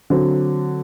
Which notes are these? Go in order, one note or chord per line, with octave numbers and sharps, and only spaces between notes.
D3 F#3 C4